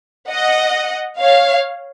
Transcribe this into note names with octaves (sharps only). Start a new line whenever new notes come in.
D#5 F#5
C#5 F5